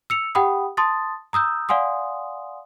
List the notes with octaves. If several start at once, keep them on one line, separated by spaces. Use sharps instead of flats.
E6 C#7 F7
G4 F#5 G5 B5 D#6
A5 C6 D#6 A6
A#5 D#6 E6 G6
D5 F5 F#5 G#5 C6 D#6